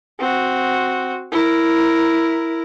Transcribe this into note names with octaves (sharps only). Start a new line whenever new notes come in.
C4 F#4
E4 A#4